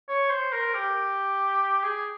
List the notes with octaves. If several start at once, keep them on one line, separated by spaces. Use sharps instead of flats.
C#5
C5
A#4
G4
G#4